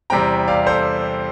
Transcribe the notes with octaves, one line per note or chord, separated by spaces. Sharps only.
E2 C3 G3 C4 G5 A#5
D5 F5
A4 C5